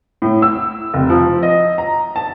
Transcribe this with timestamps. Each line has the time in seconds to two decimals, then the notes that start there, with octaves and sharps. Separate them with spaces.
0.22 A2
0.42 E6
0.94 F1
1.10 F3
1.43 D#5
1.78 A#5
2.16 A5